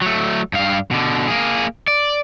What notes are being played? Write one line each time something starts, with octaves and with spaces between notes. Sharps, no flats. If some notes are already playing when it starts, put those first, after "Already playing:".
F#3 A3
G2 F5
B2 D3
A#3 G#4
D5